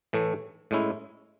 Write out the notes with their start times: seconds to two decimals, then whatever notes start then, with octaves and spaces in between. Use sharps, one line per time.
0.13 A2 E3 A3
0.71 A2 G#3 C#4 E4